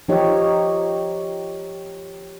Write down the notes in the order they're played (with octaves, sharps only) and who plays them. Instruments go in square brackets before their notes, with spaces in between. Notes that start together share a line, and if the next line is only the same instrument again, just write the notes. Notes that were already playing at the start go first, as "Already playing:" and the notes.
[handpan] F3 D#4 G4 C#5 D#5